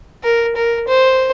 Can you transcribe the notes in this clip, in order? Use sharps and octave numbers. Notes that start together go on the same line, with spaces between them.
A#4
A#4
C5